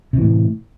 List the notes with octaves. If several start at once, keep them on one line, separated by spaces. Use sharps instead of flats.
A2 C3 E3